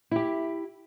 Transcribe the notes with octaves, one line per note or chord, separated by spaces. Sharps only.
E4 G4